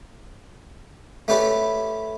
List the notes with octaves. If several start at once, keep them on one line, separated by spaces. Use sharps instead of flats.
A3 C#4 G4 B4 D5